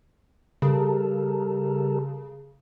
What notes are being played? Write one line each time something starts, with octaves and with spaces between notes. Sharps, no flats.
C#3 G3 A4 A#4